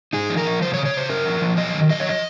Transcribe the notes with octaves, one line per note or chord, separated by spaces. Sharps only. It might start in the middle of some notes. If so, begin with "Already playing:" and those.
D#4 G#4
F3
A#4
F3
C#3 C5
C#5
C#3
C#5
C#3 C5
C#4 A#4
F3
F3
F#3 D#5
D#3
F#3 D#5
C#5
F3 D#5